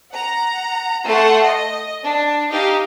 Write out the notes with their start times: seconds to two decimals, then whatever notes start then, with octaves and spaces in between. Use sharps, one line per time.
0.12 F#5 A#5
1.07 A3 A4 F#5 C6 C#6
1.43 D#5
2.04 D4
2.52 D#4 G4 F5